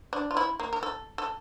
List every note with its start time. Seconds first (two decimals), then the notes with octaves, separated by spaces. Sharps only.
0.13 D4
0.31 F4
0.37 E4
0.59 A#3
0.73 A#4
0.83 A4
1.18 A4